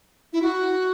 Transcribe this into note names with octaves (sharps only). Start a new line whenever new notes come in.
E4
F#4